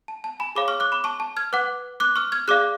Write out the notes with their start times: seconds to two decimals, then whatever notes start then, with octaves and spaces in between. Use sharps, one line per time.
0.08 A5
0.24 A5
0.40 G#5 B5
0.55 G#4 C#5 F5 B5 D6
0.68 C#6 F6
0.80 D6 F#6
0.92 B5 D6
1.04 A5 C#6
1.20 A5
1.37 F6 G#6
1.53 B4 F#5 D6 F#6
2.00 D6 F#6
2.16 C#6 F6
2.32 F6 G#6
2.48 G#4 D5 F5 D6 F#6